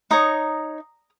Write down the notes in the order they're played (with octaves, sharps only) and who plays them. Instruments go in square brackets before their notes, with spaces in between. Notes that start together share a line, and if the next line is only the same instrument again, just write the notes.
[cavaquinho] D#4 C#5 A#5 D#6